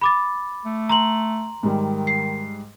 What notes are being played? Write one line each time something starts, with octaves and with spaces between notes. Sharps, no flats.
B5 D6 A6
A3
A#5 C6 F#7
G#2 D#3 G3
C7